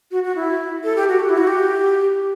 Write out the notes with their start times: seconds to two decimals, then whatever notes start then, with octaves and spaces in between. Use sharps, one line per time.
0.11 F#4
0.23 F#4
0.36 E4
0.84 A4
0.96 G4
1.08 F#4
1.20 G4
1.29 E4
1.38 F#4
1.47 G4